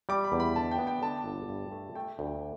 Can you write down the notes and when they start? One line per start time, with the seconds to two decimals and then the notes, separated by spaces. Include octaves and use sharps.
0.09 G3 D6
0.25 B5
0.32 E2
0.40 B5
0.56 D3 A5
0.71 G5
0.79 B3
0.87 G5
1.02 D3 A5
1.26 G1
1.49 G2
1.72 A3
1.95 A3 G5
2.19 D2